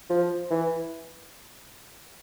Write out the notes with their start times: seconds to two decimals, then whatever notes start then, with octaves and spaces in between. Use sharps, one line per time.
0.10 F3
0.51 E3